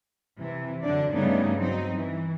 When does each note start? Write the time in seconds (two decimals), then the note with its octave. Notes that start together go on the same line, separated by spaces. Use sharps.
0.39 C3 E3
0.82 F#2 D3 D4 D5
1.11 G2 C#3 A3 B3 D4 D#4
1.58 F#3 C4 D#4
1.93 E3